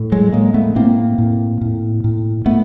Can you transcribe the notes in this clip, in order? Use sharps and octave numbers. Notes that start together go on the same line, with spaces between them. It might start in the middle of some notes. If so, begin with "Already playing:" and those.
Already playing: A2
F#3 G#3
A2 G#3 A#3
A3 B3
A2 A#3 C4
A2
A2
A2
A2 A3 B3